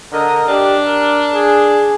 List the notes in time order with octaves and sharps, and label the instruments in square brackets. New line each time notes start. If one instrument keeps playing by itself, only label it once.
[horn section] D3 D#5 [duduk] A#4
[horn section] D4 [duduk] G4
[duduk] A#4
G#4